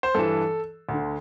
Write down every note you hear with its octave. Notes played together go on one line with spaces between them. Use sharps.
C5
G2 E3 A4
D2 D3